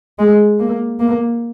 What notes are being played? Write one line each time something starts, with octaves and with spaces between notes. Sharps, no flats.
G#3
A#3
A#3